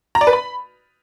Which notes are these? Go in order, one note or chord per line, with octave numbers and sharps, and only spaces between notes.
A#5
D5
B4
B5